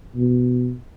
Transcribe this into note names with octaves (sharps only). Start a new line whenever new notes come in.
B2